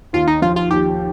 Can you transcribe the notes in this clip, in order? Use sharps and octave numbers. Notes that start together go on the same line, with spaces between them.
D#2 F4
D#4
F3 F4
F4
D#2 G4